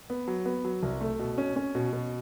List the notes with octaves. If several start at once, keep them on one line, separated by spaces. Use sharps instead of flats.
B3
F#3
B3
F#3
C2
A3
B2
C#4
C#4
B2
B2